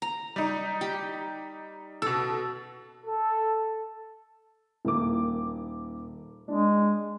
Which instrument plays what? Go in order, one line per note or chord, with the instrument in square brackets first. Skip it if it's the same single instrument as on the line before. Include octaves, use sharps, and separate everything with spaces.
[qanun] A#5
[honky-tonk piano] G3 D#4
[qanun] G4
[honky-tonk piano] B2 E6 [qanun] A4
[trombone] A4
[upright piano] D#1 A#3 D6
[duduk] G#3 [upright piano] D4